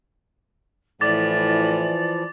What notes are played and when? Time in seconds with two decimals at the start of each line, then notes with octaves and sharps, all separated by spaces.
1.01 A2 E3 F3 D5 D6 A6